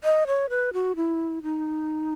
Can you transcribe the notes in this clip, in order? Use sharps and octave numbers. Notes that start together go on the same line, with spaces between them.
D#5
C#5
B4
F#4
E4
D#4